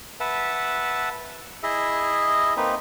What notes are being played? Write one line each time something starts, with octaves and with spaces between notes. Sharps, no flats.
B4 E5 F#5 A5
E4 G#4 D#5 E5
A#3 C4 D#4 B4